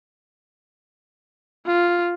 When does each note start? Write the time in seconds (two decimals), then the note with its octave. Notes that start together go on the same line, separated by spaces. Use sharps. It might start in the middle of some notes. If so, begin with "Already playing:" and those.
1.66 F4